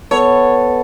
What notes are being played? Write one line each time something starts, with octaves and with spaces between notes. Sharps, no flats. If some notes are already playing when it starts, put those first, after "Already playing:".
B3 A4 C#5